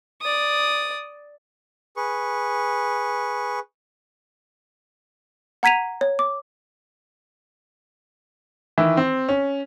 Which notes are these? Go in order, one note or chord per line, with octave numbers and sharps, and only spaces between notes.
D5 D#6
G#4 B4 C#6
F#5 A#5 G#6 B6 D#7 F7
C#5
D6
D#3 E3 E4
C4
C#4